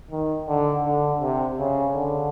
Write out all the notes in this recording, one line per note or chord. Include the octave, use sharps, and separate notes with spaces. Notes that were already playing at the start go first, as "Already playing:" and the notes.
D#3
D3
D3
C3
C#3
D3